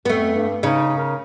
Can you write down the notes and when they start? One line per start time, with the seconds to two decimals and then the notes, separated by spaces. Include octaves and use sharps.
0.05 F2 A3 B3
0.35 G2
0.63 C#3 D#4
0.98 A#4